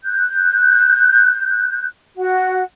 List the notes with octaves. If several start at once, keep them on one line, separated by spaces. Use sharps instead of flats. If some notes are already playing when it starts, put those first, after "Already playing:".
F#6 G6
F#4 F#5